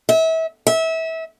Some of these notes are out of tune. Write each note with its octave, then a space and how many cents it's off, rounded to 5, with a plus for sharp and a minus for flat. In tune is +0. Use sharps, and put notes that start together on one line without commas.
E5 -30
E5 -25